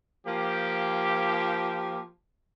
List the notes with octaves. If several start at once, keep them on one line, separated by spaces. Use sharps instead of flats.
F3 A#3 G4